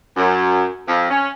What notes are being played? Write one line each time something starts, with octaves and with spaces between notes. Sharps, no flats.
F#2
F2
C#4